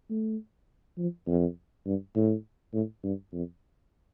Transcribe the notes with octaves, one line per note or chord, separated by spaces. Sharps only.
A3
F3
F2
G2
A2
A2
G2
F2